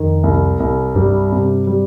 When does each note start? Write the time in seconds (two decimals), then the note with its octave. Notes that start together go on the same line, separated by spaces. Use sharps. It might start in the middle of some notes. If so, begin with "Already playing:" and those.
Already playing: F2 D#3
0.23 C2
0.60 C2
0.95 G2 G3
1.32 C3
1.67 G3